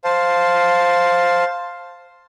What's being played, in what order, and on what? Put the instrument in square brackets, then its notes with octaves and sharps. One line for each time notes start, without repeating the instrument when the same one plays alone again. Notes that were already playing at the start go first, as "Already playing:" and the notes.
[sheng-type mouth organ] C5 F5 A5